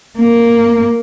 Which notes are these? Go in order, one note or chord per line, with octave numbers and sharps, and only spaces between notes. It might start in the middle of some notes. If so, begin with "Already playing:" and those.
A#3